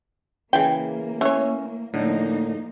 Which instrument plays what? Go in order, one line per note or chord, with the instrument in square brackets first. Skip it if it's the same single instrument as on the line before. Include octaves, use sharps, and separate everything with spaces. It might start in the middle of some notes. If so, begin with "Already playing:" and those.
[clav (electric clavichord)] C#3 E3 [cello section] A#3 [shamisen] G#4 G5
[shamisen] E3 C#5 [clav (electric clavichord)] C#4
[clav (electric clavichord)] A2 D3 [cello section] F3 A#3 D#4